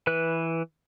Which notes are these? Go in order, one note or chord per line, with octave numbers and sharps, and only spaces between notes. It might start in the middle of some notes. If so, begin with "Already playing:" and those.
E3 B4 F#6